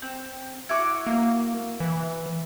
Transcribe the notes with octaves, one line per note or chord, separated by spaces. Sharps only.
C4
E4 F#4 D6
A#3
E3